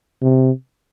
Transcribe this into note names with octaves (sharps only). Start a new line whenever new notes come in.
C3